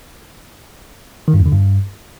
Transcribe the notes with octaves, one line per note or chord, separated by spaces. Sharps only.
D#3
G2
E2
D3
G2